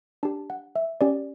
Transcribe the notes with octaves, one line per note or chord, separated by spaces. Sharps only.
D4 G4 A5
F#5
E5
C#4 G4 D5